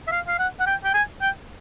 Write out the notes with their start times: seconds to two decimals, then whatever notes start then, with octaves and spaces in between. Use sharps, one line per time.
0.08 E5
0.12 F5
0.28 F5
0.39 F#5
0.60 F#5
0.66 G5
0.84 G5
0.94 G#5
1.21 G5